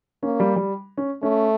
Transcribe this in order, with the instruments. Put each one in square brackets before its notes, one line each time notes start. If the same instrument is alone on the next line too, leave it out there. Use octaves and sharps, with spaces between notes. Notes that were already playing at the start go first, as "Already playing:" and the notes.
[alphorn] A#3 [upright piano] C#4
[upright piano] G3
G3
C#4
[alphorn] A3 [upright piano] C#4